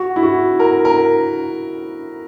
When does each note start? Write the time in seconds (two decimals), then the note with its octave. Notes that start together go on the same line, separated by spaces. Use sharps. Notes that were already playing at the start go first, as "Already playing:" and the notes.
Already playing: F#4
0.16 E4
0.23 F#4
0.59 A#4
0.85 A#4